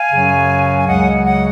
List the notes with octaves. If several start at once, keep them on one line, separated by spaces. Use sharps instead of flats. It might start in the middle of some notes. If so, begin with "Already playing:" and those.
Already playing: F5 G#5
F#2 C#3 F#3
G#5
C#2 C#3 F#3 D#5 F#5
D#5 F#5